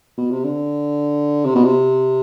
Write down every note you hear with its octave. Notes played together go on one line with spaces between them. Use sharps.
B2
C3
D3
C3
B2
C3